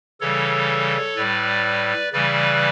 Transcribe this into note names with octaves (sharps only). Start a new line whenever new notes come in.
C#3 E3 G3 A4 C#5
A2 G3 B4 D5
C#3 E3 G3 B4 D5